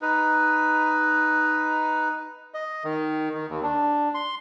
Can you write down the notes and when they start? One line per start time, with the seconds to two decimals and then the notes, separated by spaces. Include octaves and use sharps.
0.02 D#4 B4
2.54 D#5
2.84 D#3
3.34 D#3
3.49 D#2
3.63 D4
4.14 C6